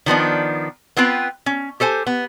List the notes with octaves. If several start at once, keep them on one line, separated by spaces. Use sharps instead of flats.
D#3 F3 B3 D4
B3 C4 F4 B4 G5
C#4
G4 A4 C5 G#5
B3